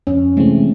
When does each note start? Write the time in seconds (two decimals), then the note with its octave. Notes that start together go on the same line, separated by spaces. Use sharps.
0.07 F2 C#4
0.37 C3 E3 G#3 A3 C4